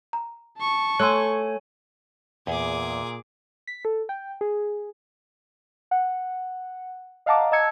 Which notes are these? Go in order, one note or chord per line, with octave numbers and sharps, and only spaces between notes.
A#5
A5 C#6
A3 C#5 G#5 C6 E6 F#6
E2 A#2 G#4 D6
B6
A4
G5
G#4
F#5
D#5 F5 F#5 A5 A#5 D6
D#5 A5 A#5 E6 G#6 C#7